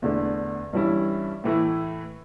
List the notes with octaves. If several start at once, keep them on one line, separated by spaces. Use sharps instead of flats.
E2 D3 A3 D4
G2 E3 G3 C#4 E4
A2 E3 A3 E4